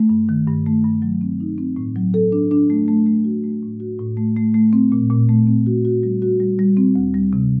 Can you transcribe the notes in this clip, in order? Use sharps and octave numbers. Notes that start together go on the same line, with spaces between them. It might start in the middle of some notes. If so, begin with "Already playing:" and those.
Already playing: A3
G2
D#3
G2
A3
G2
F#3
C4
D#4
C4
A2
F#3
A4
D4
D4
A3
A3
A3
F#4
A3
A2
F#4
A2
A3
A3
A3
C4
A#2
A#2
A3
C4
F#4
F#4
G3
F#4
G3
G3
C4
D2
G3
C3